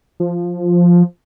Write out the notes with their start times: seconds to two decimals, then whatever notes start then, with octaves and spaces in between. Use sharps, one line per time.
0.20 F3